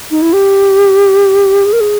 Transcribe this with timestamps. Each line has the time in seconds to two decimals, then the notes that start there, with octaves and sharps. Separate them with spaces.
0.11 D#4
0.22 E4
0.33 G4
1.65 G#4
1.73 A#4
1.81 G#4